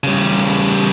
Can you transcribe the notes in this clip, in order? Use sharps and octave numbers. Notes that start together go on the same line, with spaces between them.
C#3 G3